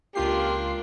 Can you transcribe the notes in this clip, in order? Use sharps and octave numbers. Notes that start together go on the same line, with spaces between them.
C#2 A#3 D4 F4 G4 C7